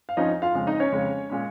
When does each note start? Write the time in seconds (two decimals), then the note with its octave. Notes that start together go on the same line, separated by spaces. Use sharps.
0.09 F5
0.17 F2 F3 C#4 D#4 D#5
0.42 F4 F5
0.55 F2 C#3 G#3
0.67 D#4 D#5
0.80 C#4 C#5
0.92 F2 C#3 G#3
1.30 A#2 G#3 C#4